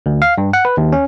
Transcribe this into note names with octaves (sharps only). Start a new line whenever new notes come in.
D2
F5
G2
F#5
B4
D#2
C#4